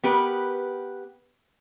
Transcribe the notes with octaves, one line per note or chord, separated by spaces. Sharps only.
B3 G4 A#4 B4